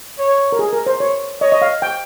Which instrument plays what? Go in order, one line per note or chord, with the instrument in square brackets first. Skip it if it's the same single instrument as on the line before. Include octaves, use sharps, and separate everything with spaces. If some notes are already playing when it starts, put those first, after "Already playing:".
[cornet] C#5
[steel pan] A#4
G#4
A#4
C5
C#5
[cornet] C#5 [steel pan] D#5
[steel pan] D#5
F5
G5